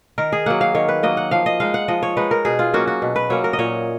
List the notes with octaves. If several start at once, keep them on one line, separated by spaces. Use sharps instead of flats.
D#3 A#4
G#4
F#3 A#3 F#5
F5
D#3 C#5
B4
F#3 A#3 D#5
F#5
F3 F5
D#5
G#3 D#4 F5
F#5
F3 D#5
C#5
G#3 D#4 B4
A#4
B2 G#4
F4
F#3 A#3 C#4 F#4
F#4
B2
B4
F#3 A#3 C#4 C#5
A#4
D#5
A#2 C#5